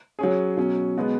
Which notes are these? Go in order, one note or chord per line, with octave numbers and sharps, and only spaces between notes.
F#3 C#4 G#4
B2 F#3 C#4
B2 G#3 B3